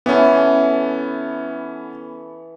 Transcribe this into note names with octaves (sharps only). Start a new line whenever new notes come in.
E3 B3 C#4 A4